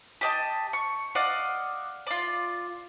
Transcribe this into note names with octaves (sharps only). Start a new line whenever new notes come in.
G4 D#5 A5
C#6
D5 D#5 F5 F#5
F4 D5